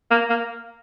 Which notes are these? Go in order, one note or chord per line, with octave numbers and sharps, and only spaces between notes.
A#3
A#3